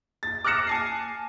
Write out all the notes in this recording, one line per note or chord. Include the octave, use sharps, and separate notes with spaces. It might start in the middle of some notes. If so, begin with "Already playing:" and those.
A6
D6 F6 F#6 A#6 C#7 E7
G#5 A5 C7